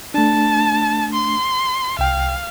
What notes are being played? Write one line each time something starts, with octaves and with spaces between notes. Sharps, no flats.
A3 D4 A5
C6
C2 F5 G5